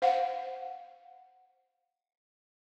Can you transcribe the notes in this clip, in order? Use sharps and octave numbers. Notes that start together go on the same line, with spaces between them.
C5 F5 F#5